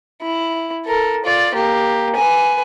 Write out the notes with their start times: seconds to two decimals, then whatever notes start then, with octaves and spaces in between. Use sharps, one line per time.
0.22 E4
0.86 A4 A#4
1.25 F4 D5
1.54 A#3 G4
2.16 B4 G#5